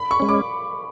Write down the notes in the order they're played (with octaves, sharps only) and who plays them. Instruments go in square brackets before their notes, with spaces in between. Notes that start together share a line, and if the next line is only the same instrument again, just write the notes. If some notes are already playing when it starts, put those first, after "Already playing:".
Already playing: [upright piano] B5
C#6
[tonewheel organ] G#3 C#4
[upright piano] D6